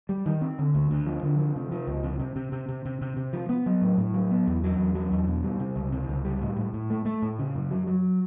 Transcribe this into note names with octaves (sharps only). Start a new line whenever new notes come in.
G3
D#3
C4
D3
D2
D2
F3
D3
F3
C3
F3
C#2
C3
C3
C3
C3
C3
C3
C3
C3
F3
B3
F#3
A2
A2
F#3
B3
E2
F#3
E2
F#3
E2
B2
G3
C3
C#2
C3
C#2
G3
A2
A2
A2
A3
A3
A2
C#3
F#2
F#3
F#3